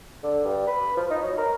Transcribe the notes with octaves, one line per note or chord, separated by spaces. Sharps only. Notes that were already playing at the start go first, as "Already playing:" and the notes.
D3
G2
B4
F3
D#4
F#3
A#4